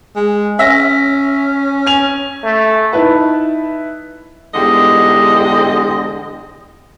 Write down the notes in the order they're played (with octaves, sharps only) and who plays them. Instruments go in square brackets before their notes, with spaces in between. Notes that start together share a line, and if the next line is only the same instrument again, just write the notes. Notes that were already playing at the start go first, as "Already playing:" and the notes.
[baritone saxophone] G#3
[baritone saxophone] C#4 [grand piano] E5 A#6
[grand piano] G#5 F7
[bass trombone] A3
[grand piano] D#4 E4 B4 A5
[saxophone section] E2 G#2 D3 G3 G#3 D#5